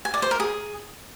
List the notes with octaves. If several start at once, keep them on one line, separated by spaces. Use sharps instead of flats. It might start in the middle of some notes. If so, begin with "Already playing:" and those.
G#5
D5
C5
A#4
G#4